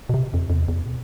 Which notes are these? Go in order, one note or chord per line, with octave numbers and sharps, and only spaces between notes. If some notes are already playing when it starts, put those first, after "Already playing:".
B2
C3
F2
F2
E2
E2
F2
B2